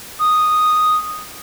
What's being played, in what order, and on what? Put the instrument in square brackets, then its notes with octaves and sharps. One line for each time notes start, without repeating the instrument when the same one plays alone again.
[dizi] D#6